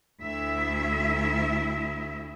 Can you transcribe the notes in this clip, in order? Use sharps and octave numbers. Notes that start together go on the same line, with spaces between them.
D2 E4 E5